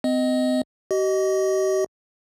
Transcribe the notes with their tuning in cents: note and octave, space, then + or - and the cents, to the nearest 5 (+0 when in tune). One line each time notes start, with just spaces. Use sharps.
C4 -40 D#5 +0
G4 -45 D#5 +0